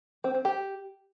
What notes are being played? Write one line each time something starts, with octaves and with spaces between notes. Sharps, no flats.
C4
C4
G4